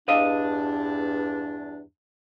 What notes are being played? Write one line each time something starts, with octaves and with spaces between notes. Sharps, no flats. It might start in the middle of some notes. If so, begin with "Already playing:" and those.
E2 G2 D4 D#5 F5